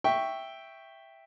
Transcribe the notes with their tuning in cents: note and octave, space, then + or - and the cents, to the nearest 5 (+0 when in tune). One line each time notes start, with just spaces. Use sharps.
E5 +0 G5 +0 C#6 +0